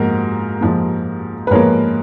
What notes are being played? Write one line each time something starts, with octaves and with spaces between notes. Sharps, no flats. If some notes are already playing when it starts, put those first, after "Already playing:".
Already playing: G#2 F3 A#3 F#4 A#4
G#2 F3 A#3
B4
G#2 F3 A#3 A#4 C#5